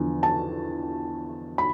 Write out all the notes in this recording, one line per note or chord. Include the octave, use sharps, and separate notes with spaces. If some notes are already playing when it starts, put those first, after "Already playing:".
Already playing: E2 D3 F3
A5
B5